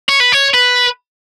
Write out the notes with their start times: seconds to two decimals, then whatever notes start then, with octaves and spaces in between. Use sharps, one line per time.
0.09 C#5
0.20 B4
0.33 C#5
0.54 B4